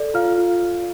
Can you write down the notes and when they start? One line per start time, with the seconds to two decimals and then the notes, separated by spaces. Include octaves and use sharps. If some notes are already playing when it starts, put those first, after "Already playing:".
Already playing: A4 D5
0.14 F4 F5 F6
0.37 F4